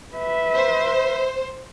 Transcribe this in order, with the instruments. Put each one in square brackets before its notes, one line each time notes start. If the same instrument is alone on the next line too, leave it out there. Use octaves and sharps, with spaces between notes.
[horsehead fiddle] B4 E5
[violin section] C5